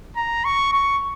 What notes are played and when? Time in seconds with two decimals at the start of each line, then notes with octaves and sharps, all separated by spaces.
0.16 A#5
0.45 C#6
0.73 C#6